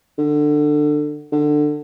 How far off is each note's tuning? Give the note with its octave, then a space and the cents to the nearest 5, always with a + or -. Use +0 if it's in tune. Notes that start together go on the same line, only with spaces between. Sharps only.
D3 +20
D3 +20